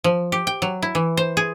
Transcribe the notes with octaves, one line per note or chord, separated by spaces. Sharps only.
F3
G4
G5
F#3
E4
E3
C5
G#4